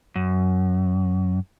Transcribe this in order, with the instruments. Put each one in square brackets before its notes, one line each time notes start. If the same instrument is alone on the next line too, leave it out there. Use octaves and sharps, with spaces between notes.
[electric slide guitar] F#2